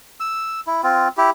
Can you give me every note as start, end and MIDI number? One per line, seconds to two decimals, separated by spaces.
0.20 0.61 88
0.67 0.81 64
0.83 1.08 60
0.83 1.08 65
1.17 1.30 64
1.17 1.30 67